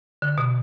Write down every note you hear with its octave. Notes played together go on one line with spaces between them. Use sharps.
D3
B2